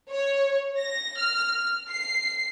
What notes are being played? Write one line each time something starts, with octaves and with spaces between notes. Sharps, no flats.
C#5
A#6
F6
C7